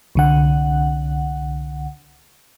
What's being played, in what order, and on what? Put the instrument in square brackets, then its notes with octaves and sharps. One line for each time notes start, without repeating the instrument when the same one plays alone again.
[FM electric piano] C2 D3 F#5